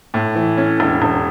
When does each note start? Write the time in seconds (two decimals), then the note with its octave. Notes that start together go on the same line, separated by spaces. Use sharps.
0.14 A2
0.35 E3
0.57 C#4
0.80 E1
1.02 E1